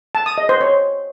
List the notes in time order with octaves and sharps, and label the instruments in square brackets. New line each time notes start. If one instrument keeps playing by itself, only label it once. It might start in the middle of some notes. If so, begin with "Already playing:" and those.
[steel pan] A5
D#6
D#5
C5
C#5